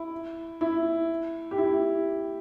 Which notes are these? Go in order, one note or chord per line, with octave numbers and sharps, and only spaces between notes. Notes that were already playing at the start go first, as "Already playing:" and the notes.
Already playing: E4
E4
G4
E4